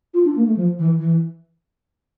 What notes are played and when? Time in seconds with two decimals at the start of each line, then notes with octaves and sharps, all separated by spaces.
0.14 F4
0.25 D4
0.36 A#3
0.46 A3
0.57 F3
0.79 E3
0.99 E3